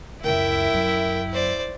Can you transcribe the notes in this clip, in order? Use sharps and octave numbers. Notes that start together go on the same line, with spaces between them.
C#2 F#2 E4 A#4 E5 G5
F#2
C5 D5